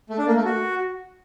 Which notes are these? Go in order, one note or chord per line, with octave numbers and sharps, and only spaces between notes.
A3
D4
A#3
A3
F#4